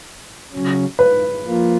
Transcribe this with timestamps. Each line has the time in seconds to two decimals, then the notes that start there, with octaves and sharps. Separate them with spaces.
0.53 C#3 F#3 C#4
0.99 B4
1.45 F3 A#3 F4